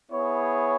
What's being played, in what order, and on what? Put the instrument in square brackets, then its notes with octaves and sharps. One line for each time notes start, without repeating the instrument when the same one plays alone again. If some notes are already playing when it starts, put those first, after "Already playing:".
[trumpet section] B3 E4 G#4 C#5